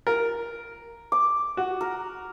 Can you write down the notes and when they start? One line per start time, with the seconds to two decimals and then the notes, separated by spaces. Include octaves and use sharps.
0.07 A#4
1.12 D6
1.57 F#4
1.81 A#4